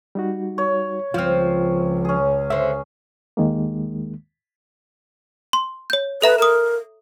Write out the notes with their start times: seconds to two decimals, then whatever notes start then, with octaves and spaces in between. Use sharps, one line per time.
0.15 G3 D#4 F#4
0.58 C#5
1.14 C#2 F3 C4 F4 F6
2.05 C#4 G#4
2.50 D3 C5 E5
3.37 D#2 D#3 G#3 A#3
5.53 C6
5.90 C#5 G6
6.22 A4 B4 E5 A#5
6.38 A#4 A#5 D#6